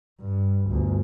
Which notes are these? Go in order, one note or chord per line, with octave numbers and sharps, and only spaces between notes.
G2
G1 D2